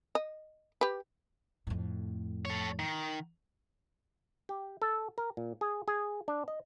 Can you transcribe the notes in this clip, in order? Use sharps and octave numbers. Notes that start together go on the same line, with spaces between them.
D#5
G4 B4
F2 A2
A4 C#5
D#3
G4
A4
A#4
A#2
G#4
G#4
D4
D#5